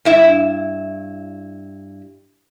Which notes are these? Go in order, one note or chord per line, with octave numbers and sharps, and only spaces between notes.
G2 E4 E5